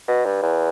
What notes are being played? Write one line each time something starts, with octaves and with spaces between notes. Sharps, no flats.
B2
G2
E2